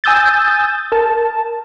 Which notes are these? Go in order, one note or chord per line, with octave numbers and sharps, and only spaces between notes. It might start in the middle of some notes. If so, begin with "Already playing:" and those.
G#5 D#6 E6 G6 A6
A#4 A5